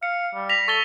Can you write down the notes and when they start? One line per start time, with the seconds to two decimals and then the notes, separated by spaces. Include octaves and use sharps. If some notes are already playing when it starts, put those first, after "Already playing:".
0.03 F5 C#7
0.35 G3
0.49 A#6 B6 F7
0.68 A4 C#6 A6 G7